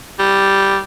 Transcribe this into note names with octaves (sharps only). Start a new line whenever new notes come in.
G3